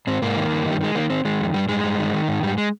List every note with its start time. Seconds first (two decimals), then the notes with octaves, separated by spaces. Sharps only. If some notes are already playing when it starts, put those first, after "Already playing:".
0.07 G#2 C4
0.22 G#2 A#3
0.37 D#3
0.51 G2
0.66 D#3
0.71 G3
0.81 D#3 G#3
0.95 D#3 A#3
1.10 D#3 C4
1.25 D#3 G#3
1.39 F2
1.54 G2 G3
1.69 G2 G#3
1.84 G2
1.98 D#3
2.14 D#3
2.28 G#2
2.43 G#2 G3
2.58 G#3